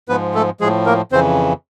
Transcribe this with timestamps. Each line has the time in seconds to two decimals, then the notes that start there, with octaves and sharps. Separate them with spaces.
0.09 G#2 F3 B3 B4
0.34 A3 A4
0.60 A2 F3 G#3 G#4
0.86 A#3 A#4
1.12 F2 C#3 E3 C4 C5